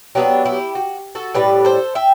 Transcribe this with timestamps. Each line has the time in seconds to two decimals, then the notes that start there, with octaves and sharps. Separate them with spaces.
0.15 F#3 B3 D4 E4 G4
0.45 E4 G4
0.75 F#4
1.15 F#4 A4
1.35 A2 G3 D4 G4 B4
1.65 A4 C5
1.95 E5 G5